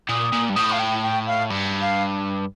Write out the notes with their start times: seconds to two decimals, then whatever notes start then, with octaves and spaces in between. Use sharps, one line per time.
0.09 A#2 D#6
0.32 A#2
0.49 G2
0.56 A2 D#6
0.72 F5
0.79 G5
1.03 G5
1.27 F5
1.50 G2
1.81 F5